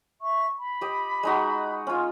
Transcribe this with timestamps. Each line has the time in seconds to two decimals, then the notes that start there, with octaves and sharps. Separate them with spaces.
0.22 E5 C#6
0.59 B5
0.81 G4 D#5
1.23 G#3 D#4 F#4
1.87 C#4 F4 C6